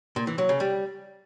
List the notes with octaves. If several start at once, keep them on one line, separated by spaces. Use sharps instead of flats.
A#2
E3
F#3
C#3
G3